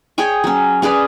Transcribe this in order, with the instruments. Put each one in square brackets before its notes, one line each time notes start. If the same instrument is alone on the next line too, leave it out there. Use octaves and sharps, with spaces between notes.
[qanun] G#4 C#5 G5 G#5
F#3 C#4
C#4 G#4 B4 D5